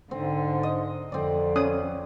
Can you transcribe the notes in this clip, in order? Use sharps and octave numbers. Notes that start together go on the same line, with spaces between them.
G#2 D3 C4
D#5
F2 D3 C4 D5
C#4 D#6